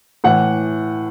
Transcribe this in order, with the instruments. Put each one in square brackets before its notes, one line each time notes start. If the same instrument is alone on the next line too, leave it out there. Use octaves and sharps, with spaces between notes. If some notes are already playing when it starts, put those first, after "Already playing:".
[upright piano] A2 E3 F#5